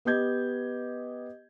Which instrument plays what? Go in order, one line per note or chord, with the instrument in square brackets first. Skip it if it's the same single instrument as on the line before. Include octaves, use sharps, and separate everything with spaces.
[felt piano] B3 G4 D#5 G6 G#6